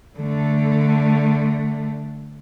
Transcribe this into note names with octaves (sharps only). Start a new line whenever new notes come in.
D3 A3